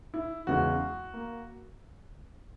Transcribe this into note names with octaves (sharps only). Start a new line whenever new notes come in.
E4
E2 C#3 E3 G#3 F#4
A#3